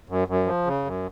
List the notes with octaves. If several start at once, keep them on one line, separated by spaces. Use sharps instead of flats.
F#2
F#2
F3
C#3
F#2